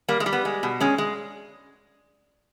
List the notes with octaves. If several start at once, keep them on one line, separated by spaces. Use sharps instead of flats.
G3 A#3
G#3
G3
B3
G#3
B2
G#3 C#4
G#3